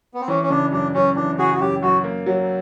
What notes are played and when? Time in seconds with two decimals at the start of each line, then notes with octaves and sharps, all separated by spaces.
0.14 B3
0.21 C4
0.28 E3 C#4
0.43 C#4
0.50 C#3 D4
0.72 F#2 D4
0.94 F#2 C#4
1.16 E3 D4
1.38 C#3 F#4 G#4
1.54 F#4
1.60 F#2 G4
1.82 F#2 F#4
2.04 A#3
2.26 F#3